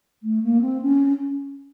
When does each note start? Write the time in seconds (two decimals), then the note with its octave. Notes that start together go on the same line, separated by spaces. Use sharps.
0.23 A3
0.42 A#3
0.61 C4
0.81 C#4